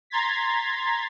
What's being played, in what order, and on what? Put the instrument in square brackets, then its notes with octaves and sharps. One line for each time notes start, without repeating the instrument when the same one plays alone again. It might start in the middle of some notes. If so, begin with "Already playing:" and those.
[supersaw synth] A#5 C6 G#6 A6 B6